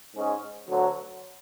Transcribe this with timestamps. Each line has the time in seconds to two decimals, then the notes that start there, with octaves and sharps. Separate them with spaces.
0.14 G#2 G#3 C#4 G#4
0.68 D2 D3 F#3